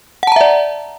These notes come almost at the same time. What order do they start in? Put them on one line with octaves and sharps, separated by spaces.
F#5 A5 A#5 E5 D5